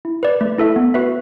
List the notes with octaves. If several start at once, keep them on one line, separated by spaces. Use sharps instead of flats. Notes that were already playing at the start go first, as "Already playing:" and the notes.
E4
B4 D5
A3
E4 A4 E5
B3
F#4 B4 E5